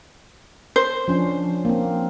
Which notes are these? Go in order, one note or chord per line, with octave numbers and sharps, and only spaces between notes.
C5
F3 C#4 D4
A#3 C4